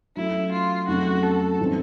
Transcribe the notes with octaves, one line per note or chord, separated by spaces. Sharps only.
F#3 A3 C#4 E4
F4
F2 C#3 F#3 A3 C#4 F#4
A4
A2 E3 G3 C4 D#4